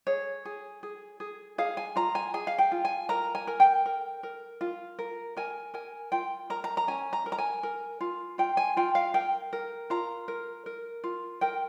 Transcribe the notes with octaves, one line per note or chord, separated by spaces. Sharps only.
G#4 C#5
G#4
G#4
G#4
G#4 F5
G#5
F4 A#5
G#5
G#4 G#5
F5
G5
F4
G#5
A#4 A#5
G#5
A#4
G5
A#4
A#4
F4
A#4
A#4 G#5
A#4 G#5
F4 G5
A#4 A#5
A#5
A#5
C#4 G#5
A#5
A#4
A#5
G#5
A#4
F4
F4 G5
G#5
F4 G5
F5
A#4 G5
A#4
F4 A#5
A#4
A#4
F4
A#4 G5